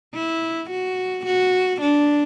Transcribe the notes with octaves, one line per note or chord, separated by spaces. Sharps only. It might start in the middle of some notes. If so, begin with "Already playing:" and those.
E4
F#4
F#4
D4